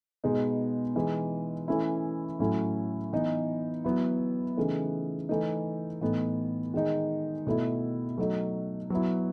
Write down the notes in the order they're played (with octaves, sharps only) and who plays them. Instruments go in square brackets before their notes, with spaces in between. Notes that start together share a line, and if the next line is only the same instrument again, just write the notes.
[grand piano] B2 G#3 B3 D#4
E3 G#3 D#4
E3 A3 C#4 E4
A2 F#3 C#4 E4
E3 B3 D#4
F#3 B3 E4
C#3 E3 A3 D#4
E3 A3 D#4
A2 E3 B3 D#4
D#3 G#3 D#4
B2 A3 E4
F#3 A3 D#4
F#3 B3 E4